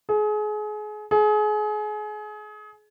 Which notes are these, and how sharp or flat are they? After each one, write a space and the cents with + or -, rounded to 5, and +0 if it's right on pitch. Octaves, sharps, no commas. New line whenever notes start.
G#4 +30
G#4 +30